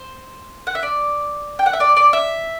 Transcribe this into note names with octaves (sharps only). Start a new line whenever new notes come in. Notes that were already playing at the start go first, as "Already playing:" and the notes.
Already playing: C5
F#5
E5
D5
G5
F#5
E5
D5
D5
E5